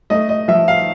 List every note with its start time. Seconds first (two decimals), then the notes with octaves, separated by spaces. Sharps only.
0.10 A3 D#5
0.29 D#5
0.48 F3 E5
0.68 F5